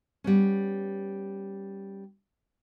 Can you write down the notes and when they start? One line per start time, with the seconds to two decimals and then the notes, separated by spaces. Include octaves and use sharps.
0.24 G3 B3 C#4